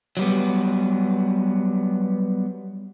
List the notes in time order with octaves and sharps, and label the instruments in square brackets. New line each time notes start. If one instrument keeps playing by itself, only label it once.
[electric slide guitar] F#3 G3 B3